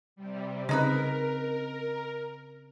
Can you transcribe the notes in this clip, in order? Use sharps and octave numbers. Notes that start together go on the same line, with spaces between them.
C3 G3
C#3 G#3 C4 D#4 A#4 B4